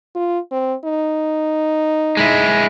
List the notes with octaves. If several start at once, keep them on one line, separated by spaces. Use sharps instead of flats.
F4
C4
D#4
G#3 E4